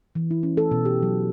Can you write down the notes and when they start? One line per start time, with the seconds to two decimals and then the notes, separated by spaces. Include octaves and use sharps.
0.15 E3
0.31 E4
0.43 C#4
0.57 A4
0.71 B2
0.85 G4
1.03 F#3